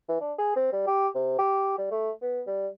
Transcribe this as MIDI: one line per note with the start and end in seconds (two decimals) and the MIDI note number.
0.08 0.18 52
0.21 0.33 62
0.38 0.54 68
0.56 0.70 60
0.73 0.86 55
0.87 1.08 67
1.15 1.38 48
1.38 1.74 67
1.78 1.87 55
1.91 2.11 57
2.22 2.42 59
2.47 2.68 55